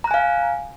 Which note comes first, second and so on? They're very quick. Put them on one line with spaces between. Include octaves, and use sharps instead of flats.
A#5 F#6 G#5 F5